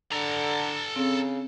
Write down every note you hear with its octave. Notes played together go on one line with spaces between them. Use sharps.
D3 A4 A#5
C#3 C4